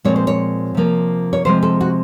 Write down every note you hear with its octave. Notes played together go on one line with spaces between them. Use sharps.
A#2 F3 G#3 C4 C#5
C5
C#5
C3 F3 A#3
C#5
C3 F3 G#3 C4 C5
A4
F#4